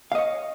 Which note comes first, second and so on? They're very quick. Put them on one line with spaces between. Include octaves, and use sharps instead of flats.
F5 D#5 C#5